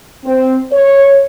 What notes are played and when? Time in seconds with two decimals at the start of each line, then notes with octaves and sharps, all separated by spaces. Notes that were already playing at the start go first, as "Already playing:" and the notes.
0.25 C4
0.72 C#5